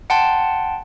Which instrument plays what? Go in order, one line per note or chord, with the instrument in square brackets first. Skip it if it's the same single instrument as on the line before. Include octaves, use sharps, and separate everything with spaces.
[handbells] F#5 G5 A5 C6